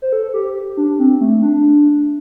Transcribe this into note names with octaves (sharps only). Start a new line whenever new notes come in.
C5
A4
G4
G4
D4
C4
A3
D4